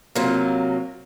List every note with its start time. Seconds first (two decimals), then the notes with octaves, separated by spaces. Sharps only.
0.15 C3 F#3 A#3 C4 F4